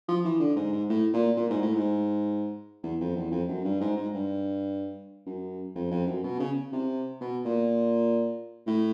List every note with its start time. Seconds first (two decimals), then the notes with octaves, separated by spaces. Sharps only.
0.08 F3
0.25 E3
0.40 D3
0.56 G#2
0.72 G#2
0.89 A2
1.13 A#2
1.37 A#2
1.50 G#2
1.62 A2
1.74 G#2
2.83 E2
3.00 F2
3.15 E2
3.31 F2
3.48 F#2
3.64 G2
3.80 G#2
3.96 G#2
4.13 G2
5.26 F#2
5.75 F2
5.91 F2
6.07 F#2
6.23 B2
6.39 C#3
6.72 C3
7.21 B2
7.45 A#2
8.66 A2